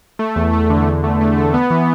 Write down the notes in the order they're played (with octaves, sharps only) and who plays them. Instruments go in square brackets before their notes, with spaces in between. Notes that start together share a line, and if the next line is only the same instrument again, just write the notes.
[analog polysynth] A3
E2
A3
D3
E2
A3
A3
A3
B3
E3